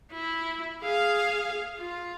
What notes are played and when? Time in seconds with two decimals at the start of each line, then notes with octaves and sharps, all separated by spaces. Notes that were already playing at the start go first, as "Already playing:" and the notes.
0.12 E4
0.82 G#4 F5
1.78 F4